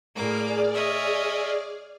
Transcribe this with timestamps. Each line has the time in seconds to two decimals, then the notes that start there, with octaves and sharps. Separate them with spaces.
0.15 A2 A#3 G#4 D5 D6 F6
0.73 C#5 D#5 E5